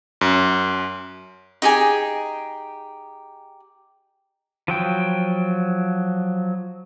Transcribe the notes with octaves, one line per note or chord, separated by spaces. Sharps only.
F#2
D#4 G4 G#4 G#5
F3 F#3 G5